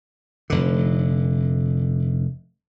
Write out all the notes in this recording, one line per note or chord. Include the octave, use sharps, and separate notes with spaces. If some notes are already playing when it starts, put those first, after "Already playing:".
F1 D3